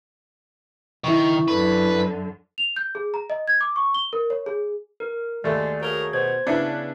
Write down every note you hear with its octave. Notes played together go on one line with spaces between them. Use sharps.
D#3 E4 C#6
F#2 D3 B4
F7
G6
G#4
A#5
D#5
G#6
D6
C#6
G7
A#4
C#5
G#4
A#4
D#2 G#3 A3 D5
F#4 G#4 A#4 C#5
B2 C5 G#6
C#3 B3 D4 E4 B4 C#7